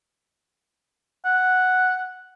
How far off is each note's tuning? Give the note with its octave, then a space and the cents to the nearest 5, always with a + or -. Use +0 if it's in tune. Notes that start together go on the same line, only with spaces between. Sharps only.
F#5 +0